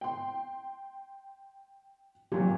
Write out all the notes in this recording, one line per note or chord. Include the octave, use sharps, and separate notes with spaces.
G5 C6
G#1 A#2 F#3 G4